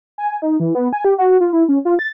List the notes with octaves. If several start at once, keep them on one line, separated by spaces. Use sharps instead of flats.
G#5
D#4
E3
B3
G#5
G4
F#4
F4
E4
C#4
F4
A6